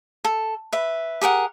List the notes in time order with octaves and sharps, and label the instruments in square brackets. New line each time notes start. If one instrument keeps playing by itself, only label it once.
[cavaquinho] A4
B4 E5
G4 G#4 A#4 F#5